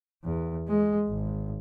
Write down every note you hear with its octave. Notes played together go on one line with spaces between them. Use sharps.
E2
G#3
G#1